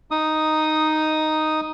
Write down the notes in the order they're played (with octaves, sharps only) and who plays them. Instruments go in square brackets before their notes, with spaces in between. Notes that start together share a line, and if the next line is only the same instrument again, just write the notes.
[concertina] D#4 D#6